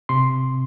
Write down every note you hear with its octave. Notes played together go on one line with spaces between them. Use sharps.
C3 C6